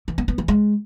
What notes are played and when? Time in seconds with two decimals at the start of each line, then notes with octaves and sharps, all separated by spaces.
0.08 E3
0.18 B3
0.28 B3
0.38 E3
0.48 G#3